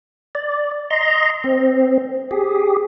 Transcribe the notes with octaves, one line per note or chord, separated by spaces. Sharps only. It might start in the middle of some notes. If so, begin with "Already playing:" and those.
D5
D#5 A#5 C6
C4
G4 G#4